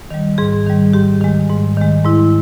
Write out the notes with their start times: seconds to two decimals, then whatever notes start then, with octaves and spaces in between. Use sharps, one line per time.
0.10 D#3 G3
0.38 G#2 G#4
0.66 D#3 G3
0.94 G#2 G4
1.21 D#3 G#3
1.49 G#2
1.77 D#3 G#3
2.05 G#2 E4